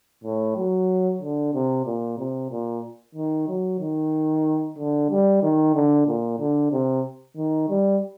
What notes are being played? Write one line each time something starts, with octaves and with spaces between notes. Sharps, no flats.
A2
F#3
D3
C3
A#2
C3
A#2
D#3
F#3
D#3
D3
G3
D#3
D3
A#2
D3
C3
D#3
G3